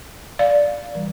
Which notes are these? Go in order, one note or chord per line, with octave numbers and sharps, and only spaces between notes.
D5 F5
E3 G3